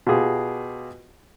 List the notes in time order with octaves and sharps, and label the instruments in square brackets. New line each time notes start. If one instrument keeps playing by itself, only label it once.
[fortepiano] B2 F4 G4 G#4